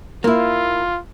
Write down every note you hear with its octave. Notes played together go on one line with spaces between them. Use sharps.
A#3 E4 F4